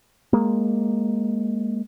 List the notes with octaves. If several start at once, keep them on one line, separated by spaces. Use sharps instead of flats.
G#3 A#3